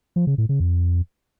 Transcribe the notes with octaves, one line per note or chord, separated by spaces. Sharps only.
F3
C#3
A2
C#3
F2